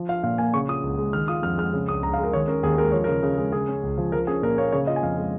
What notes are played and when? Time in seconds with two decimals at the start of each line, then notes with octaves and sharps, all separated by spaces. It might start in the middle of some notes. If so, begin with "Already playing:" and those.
Already playing: F3
0.09 F4 F5
0.24 A#2 F5
0.38 A#3 G#5
0.54 C#3 C#6
0.69 F4 D#6
0.84 C#2
0.98 G#3
1.13 D#3 F6
1.28 F4 D#6
1.43 F2 F6
1.58 G#3 F6
1.73 C#3
1.88 C#2 D#6
2.03 C#2 A#5
2.13 F5
2.18 G#3
2.24 A#4
2.33 D#3 C#5
2.48 C#4 A#4
2.63 D#2 G#4
2.78 G#3 A#4
2.92 F3 C#5
3.04 C#3 A#4
3.23 C#3
3.37 G#3
3.52 C#3 G#4
3.69 C#4
3.83 C#2
3.98 F3
4.12 F3 A#4
4.27 C#4 G#4
4.42 A#2 A#4
4.58 A#3 C#5
4.72 C#3 C#5
4.87 F4 D#5
4.96 G#5
5.03 F2 F5
5.17 G#3